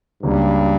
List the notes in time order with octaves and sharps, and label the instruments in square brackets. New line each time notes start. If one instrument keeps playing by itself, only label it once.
[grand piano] C#2 C#3 F#3 A#3 [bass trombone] G2